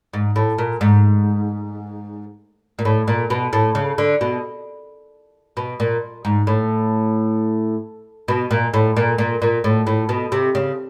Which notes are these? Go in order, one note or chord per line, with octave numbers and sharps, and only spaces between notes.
G#2
A2
A#2
G#2
A#2
A2
A#2
B2
A2
C#3
D3
B2
B2
A#2
G#2
A2
B2
A#2
A2
A#2
A#2
A#2
A2
A2
B2
C3
C#3